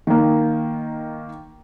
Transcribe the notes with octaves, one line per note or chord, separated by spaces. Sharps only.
D#3 A#3